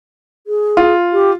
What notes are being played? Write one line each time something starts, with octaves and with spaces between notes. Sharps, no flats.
G#4
F4
G4